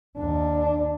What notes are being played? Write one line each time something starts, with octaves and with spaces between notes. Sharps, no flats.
D#2 D4